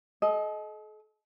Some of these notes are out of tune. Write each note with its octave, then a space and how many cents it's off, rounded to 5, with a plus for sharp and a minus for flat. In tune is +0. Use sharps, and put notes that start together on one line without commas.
A4 -45 D#5 +5